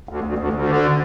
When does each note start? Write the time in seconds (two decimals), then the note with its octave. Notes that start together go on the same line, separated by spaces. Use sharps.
0.09 D2
0.24 D2
0.38 D2
0.53 D2
0.68 D3